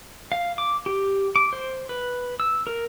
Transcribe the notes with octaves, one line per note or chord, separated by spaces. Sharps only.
F5
D6
G4
D6
C5
B4
E6
A#4